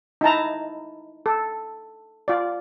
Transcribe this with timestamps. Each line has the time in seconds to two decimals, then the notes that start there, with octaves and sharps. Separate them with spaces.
0.21 D#4 E4 A5 A#5
1.26 A4
2.28 F4 D5